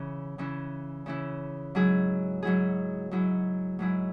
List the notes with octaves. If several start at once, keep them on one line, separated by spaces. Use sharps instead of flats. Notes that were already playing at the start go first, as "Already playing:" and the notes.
Already playing: C#3 E3 C#4 E4
C#3 E3 C#4 E4
C#3 E3 C#4 E4
G#2 F#3 E4 G#4
G#2 F#3 E4 G#4
G#2 F#3 E4 G#4
G#2 F#3 E4 G#4